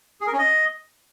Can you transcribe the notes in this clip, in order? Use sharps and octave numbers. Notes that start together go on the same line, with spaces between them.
G#4
A#4
C#4
D#5